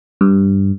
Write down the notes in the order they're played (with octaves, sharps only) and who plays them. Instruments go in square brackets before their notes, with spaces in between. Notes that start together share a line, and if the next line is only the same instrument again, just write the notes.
[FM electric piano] G2